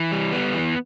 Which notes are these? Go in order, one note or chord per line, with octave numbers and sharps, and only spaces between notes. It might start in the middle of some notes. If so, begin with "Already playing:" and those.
Already playing: E3
G3
B3
E3